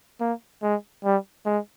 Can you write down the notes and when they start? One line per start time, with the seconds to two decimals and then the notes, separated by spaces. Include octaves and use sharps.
0.20 A#3
0.63 G#3
1.04 G3
1.46 G#3